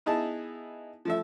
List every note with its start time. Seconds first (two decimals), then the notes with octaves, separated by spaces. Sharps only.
0.06 B3 D#4 E4 G#4 A5
1.05 F3 A3 E5